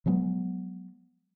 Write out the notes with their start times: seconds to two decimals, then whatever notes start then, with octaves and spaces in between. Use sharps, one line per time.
0.06 F3 F#3 G#3 B3